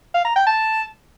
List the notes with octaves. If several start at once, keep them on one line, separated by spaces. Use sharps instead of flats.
F5
A#5
G5
A5